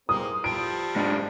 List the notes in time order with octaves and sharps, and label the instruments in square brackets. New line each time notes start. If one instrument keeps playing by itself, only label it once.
[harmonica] G#3 A#3 C4 [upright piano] D#6
[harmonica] F3 G3 A4 [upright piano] D7
[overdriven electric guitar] G#2 D4